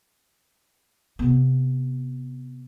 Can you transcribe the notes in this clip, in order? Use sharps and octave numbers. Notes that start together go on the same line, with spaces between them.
C3 B3